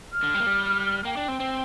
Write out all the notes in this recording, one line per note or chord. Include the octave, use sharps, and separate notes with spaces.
F6
D3
G3
A#3
G3
A#3 G5
D4
C4
C4